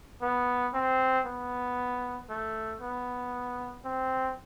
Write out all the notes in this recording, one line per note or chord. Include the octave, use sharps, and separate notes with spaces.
B3
C4
B3
A3
B3
C4